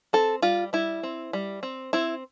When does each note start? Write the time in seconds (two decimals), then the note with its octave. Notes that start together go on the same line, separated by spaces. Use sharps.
0.13 C4 A4
0.42 G3 F4
0.73 G3 E4
1.03 C4
1.33 G3
1.63 C4
1.93 C4 E4